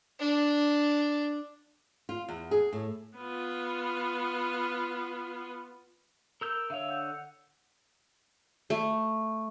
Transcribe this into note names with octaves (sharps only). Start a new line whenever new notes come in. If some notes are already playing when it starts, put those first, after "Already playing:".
D4
F4
E2
G#4
A2
B3 F4
A#4 E6 G6
D3 C#5 E5 F5 E6
F#5 E6 G6
A3